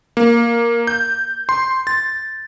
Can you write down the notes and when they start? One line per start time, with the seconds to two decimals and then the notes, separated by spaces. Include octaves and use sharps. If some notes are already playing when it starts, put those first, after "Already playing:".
0.17 A#3
0.87 G6
1.49 C6
1.87 A6